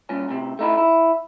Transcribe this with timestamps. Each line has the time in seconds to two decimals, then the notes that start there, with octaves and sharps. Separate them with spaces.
0.09 G2 A#2 C#4
0.29 A2 C3
0.59 A3 D#4 E4
0.77 E4